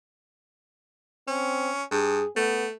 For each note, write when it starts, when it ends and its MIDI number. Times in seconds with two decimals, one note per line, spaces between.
1.28 1.70 60
1.28 1.83 61
1.91 2.20 43
1.91 2.27 68
2.36 2.72 57
2.36 2.65 59